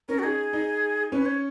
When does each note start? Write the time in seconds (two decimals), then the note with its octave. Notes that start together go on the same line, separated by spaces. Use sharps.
0.09 C#4 A#4
0.19 F#4
0.23 D#4 G#4
0.53 D#4
1.12 C#4 B4
1.26 C#5